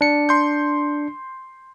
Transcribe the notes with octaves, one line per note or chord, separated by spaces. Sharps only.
D4 C#7
C6 G6